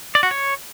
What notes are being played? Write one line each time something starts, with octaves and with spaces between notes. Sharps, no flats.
D5
F#4
C#5